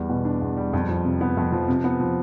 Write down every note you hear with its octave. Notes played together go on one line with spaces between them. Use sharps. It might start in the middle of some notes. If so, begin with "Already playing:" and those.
Already playing: E2 G3
B2
D4
E2
G3
F2
F3
C3
B3
F2
F3
C3
B3
F3